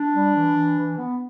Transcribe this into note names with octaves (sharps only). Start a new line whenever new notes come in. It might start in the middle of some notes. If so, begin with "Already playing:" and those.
Already playing: D4
G3
E3
E3
E3
B3